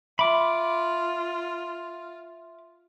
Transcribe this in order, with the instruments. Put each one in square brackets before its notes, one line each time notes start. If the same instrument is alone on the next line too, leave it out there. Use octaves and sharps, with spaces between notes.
[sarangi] F4 [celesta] E5 C6 [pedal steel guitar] B5 D6